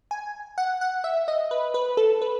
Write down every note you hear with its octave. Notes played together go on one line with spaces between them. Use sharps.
G#5
F#5
F#5
E5
D#5
B4
B4
A4
B4